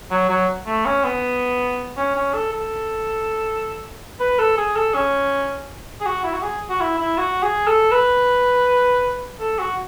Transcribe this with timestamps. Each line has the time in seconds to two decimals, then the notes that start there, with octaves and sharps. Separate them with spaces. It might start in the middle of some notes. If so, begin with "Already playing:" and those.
0.11 F#3
0.29 F#3
0.66 A3
0.85 C#4
1.04 B3
1.97 C#4
2.15 C#4
2.34 A4
2.53 A4
4.20 B4
4.39 A4
4.57 G#4
4.76 A4
4.94 C#4
6.01 G#4
6.06 F#4
6.24 E4
6.33 F#4
6.43 G#4
6.70 F#4
6.80 E4
6.99 E4
7.17 F#4
7.43 G#4
7.67 A4
7.91 B4
9.40 A4
9.59 F#4